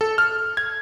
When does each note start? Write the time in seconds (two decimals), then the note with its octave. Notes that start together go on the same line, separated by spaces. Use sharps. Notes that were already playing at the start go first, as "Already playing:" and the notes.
0.01 A4
0.18 F6
0.57 G#6